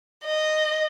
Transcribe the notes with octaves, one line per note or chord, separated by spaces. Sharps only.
D#5